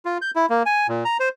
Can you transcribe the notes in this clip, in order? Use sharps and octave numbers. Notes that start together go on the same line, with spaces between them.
F4
G6
E4
A#3
G#5
A#2
A#5
C5